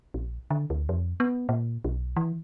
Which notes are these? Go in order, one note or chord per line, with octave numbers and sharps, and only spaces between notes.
A#1
D3
D2
F2
B3
A#2
B1
E3